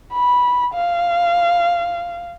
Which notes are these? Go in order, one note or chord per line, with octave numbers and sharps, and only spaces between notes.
B5
F5